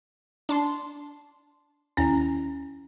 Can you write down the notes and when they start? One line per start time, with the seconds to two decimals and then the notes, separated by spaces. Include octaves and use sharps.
0.49 D4 A5 C6
1.97 D#2 C#4 E4 A#5